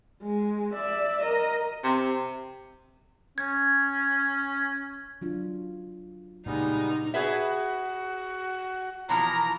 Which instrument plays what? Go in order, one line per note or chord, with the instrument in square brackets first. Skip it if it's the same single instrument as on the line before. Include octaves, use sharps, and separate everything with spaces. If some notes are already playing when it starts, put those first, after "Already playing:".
[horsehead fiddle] G#3
D5 E5
A#4 D#5
[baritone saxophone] C3
[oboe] C#4 [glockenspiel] G#6
[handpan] F#3 D4 F4
[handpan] A#2 C#3 [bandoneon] G3 G#3 B3 [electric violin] D#4
[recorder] F#4 [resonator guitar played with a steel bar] G#4 B4 E5
[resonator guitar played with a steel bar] B2 E3 F3 [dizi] A#5